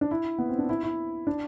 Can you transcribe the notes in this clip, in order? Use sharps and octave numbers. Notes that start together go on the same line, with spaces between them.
D4
E4
B3
C4
D4
E4
E4
D4